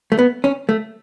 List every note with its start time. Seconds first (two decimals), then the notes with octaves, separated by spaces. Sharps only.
0.12 A3
0.19 B3
0.44 C#4
0.69 A3